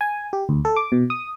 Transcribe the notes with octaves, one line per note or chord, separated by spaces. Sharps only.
G#5
G4
D2
A4
D6
B2
D#6